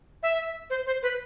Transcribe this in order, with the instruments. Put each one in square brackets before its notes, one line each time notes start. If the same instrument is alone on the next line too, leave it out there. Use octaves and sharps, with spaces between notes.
[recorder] E5
C5
C5
B4